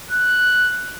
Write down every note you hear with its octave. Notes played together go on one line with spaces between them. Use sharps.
F#6